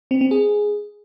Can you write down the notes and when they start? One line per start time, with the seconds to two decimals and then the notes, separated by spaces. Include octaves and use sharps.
0.11 C4
0.21 C4
0.31 G#4